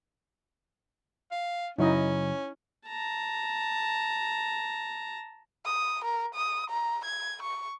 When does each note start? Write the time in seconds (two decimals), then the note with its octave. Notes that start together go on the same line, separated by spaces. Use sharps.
1.31 F5
1.78 F#2 C#3 F#3 C#4 D#4 E4 D#5
2.88 A5 A#5
5.65 D#6
6.05 A#4
6.35 D#6
6.71 A#5
7.05 G#6
7.43 C#6